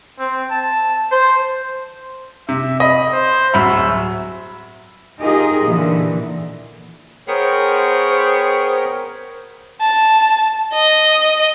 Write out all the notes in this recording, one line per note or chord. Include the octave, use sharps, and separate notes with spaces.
C4
A5
C5
C3 E5
D#5 B5
C5
D1 F#3 E5 B5
D#4 F4 G4 G#4 A#4 D#5
A#2 D3 E3
B3 G#4 A#4 C5 C#5 G5
A5
D#5